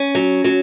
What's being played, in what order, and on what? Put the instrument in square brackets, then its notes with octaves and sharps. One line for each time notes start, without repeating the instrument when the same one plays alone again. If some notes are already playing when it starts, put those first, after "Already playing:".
Already playing: [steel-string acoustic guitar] C#4
F#3
F#3